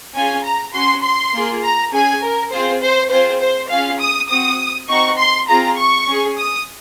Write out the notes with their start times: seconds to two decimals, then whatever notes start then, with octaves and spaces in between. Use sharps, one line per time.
0.14 C#4 F4 G#4 G#5
0.44 A#5
0.73 C#4 F#4 C6
1.03 C6
1.33 A#3 F4 G#4
1.63 A#5
1.92 C#4 G#4 G#5
2.22 A#4
2.51 C4 F4 G#4 C5
2.82 C5
3.10 C4 F4 G#4 C5
3.40 C5
3.70 C#4 F4 G#4 F5
4.00 D#6
4.30 C4 F#4 D#6
4.89 C4 D#4 F#4 C#6
5.17 C6
5.47 C4 F4 G#4 A#5
5.77 C#6
6.07 C#4 G#4
6.37 D#6